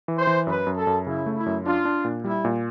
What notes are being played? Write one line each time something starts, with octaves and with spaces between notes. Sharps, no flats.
E3
C5
E3
F#2 B4
F#2
A4
F#2
C#3 E4
A3
E4
F#2
D4 F4
D4
A#2
G3 E4
A#2